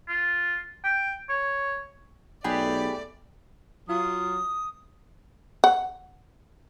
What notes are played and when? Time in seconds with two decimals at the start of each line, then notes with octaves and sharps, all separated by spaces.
0.08 F4
0.84 G5
1.29 C#5
2.44 B1 A3 G4 G#4 B4 D5
3.88 F#3 F4 D#6
5.64 F#5